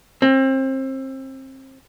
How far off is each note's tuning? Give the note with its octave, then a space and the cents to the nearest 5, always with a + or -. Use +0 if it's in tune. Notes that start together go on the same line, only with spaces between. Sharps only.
C4 +30